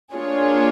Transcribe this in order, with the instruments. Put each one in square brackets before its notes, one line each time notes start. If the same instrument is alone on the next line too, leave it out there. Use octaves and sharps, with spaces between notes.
[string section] A#3 D4 F4 G#4 C#5